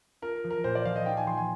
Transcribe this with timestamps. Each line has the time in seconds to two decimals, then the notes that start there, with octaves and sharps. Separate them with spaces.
0.22 F4 A#4
0.44 F3
0.51 A#4
0.64 A#2 C5
0.75 D5
0.85 F3 F5
0.96 D#5
1.06 D#4 G5
1.17 G#5
1.27 F3 C6
1.38 G#5